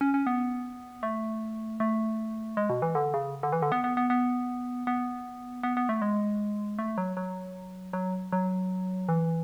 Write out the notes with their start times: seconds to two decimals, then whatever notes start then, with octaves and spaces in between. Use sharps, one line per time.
0.01 C#4
0.14 C#4
0.27 B3
1.03 A3
1.80 A3
2.57 G#3
2.70 B2
2.82 E3
2.95 D3
3.14 C#3
3.43 D3
3.52 E3
3.62 D3
3.72 B3
3.84 B3
3.97 B3
4.10 B3
4.87 B3
5.63 B3
5.77 B3
5.89 A3
6.02 G#3
6.79 A3
6.98 F#3
7.17 F#3
7.93 F#3
8.32 F#3
9.09 E3